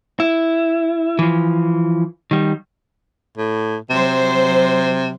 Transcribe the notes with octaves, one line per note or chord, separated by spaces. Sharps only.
E4
E3 F3
D#3 G3
A2
C3 F#3 C5